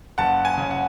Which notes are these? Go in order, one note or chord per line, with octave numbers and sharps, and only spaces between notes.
F#1 F#5 A5
G#5
C#3
F#5